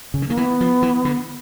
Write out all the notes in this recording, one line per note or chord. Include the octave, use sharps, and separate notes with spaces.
C#3
D3
D#3 A#3
E3 B3
F3
E3
D3